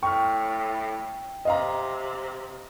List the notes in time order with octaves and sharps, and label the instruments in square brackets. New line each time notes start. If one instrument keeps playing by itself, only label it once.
[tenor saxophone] A2 [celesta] G5 [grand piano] C#6 F6
[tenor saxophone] C3 [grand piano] D#5 F5 A#5